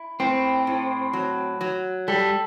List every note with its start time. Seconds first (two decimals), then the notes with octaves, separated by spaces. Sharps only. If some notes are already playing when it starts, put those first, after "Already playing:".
Already playing: E4
0.20 A2 C4
0.67 A2
1.13 F#3
1.61 F#3
2.08 G3 A4